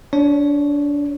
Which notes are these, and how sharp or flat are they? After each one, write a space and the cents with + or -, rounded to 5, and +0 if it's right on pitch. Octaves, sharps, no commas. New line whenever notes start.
D4 -25 C#5 +0